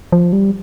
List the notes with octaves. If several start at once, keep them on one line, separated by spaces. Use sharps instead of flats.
F3
G3